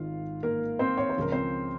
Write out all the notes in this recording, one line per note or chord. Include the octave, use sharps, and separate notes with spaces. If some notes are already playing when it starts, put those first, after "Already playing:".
Already playing: G#1 G#2 D#3 F4 F5
A#3 A#4
C4 C5
C#5
C5
C#2 C#3 F3 A#4
C4 C5